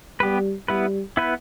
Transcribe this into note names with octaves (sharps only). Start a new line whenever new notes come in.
G3 B3 G4 B4
G3 B3 E4 B4
B3 E4 B4